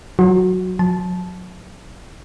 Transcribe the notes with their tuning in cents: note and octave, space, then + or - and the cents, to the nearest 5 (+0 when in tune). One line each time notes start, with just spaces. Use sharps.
F#3 +0 F#4 -10
F#3 -30 A5 -15